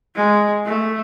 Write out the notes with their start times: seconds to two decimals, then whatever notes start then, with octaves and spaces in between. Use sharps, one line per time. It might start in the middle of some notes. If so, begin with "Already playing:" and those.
0.15 G#3
0.66 A3